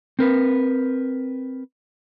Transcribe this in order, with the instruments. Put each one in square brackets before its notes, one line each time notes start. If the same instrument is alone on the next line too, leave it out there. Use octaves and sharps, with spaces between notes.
[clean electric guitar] C4 A#4 B4